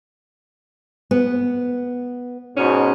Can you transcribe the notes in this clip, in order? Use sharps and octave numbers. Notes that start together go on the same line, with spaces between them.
B3
G#2 B2 C#4